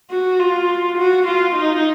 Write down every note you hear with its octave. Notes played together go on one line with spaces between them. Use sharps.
F#4
F4
F#4
F4
D#4